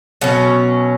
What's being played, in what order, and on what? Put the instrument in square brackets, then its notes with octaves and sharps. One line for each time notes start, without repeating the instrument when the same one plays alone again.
[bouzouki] B2 F#3 C#4